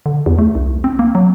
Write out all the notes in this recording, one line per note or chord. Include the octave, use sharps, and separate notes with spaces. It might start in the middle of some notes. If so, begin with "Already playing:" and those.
D3
E2
A3
C2
C4
A#3
F#3